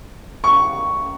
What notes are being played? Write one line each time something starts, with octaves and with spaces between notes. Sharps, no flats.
C#6